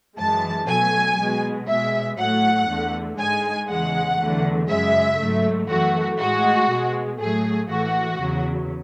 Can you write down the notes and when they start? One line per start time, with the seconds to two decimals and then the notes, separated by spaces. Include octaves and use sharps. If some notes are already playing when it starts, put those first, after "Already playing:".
0.18 F#2 E3 G#3 A5
0.68 B2 F#3 A3 G#5
1.18 B2 G#3
1.68 B2 G#3 E5
2.18 A2 F#3 A3 F#5
2.68 E2 D3 A3
3.18 G#2 G#3 G#5
3.68 E2 C#3 G#3 F#5
4.19 E2 D3 F#3 A3
4.69 F#2 C#3 G#3 E5
5.19 G#2 F#3 A3
5.68 F#2 E3 A3 F#4
6.19 A2 G#3 F#4
6.69 B2 G#3
7.19 A2 F#3 A3 G#4
7.69 A2 E3 A3 F#4
8.20 E2 C#3 F#3